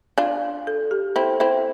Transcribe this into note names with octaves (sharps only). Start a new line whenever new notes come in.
D4 F4
A4
G4
C4 E4 A4 C5
C4 E4 A4 C5